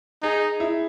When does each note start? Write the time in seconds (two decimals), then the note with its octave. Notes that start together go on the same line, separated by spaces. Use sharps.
0.23 D#4 G#4
0.60 E4